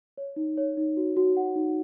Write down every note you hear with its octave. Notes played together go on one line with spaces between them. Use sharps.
C#5
D#4
C#5
D#4
F#4
F#4
F#5
D#4